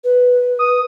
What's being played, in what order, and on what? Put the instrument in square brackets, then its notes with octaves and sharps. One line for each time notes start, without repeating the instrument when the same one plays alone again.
[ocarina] B4
[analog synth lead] D#6